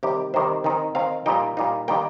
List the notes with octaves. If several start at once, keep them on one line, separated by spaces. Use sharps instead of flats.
C3 D#3 G3 G4
C3 D#3 G3 C5
D#3 C4 D#4
D#3 C4 D#4 F5
A#2 G3 D#4 G5
A#2 G3 D#4 F5
D#3 G3 A#3 G5